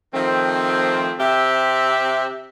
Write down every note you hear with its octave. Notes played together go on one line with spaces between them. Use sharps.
D#3 F3 A3 C4
C3 C4 G4 E5